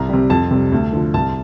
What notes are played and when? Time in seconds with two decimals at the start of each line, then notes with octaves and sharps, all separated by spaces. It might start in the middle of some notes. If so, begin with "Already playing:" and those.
Already playing: C2 A#5
0.09 C3 G3
0.30 F2 A5
0.51 C3 G3
0.72 D2
0.92 D3 F3
1.14 C2 A5